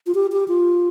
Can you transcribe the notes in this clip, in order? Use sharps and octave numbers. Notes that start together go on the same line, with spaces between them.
F4
G4
G4
F4